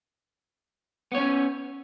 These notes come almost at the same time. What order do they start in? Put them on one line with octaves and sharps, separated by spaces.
B3 C#5 C#4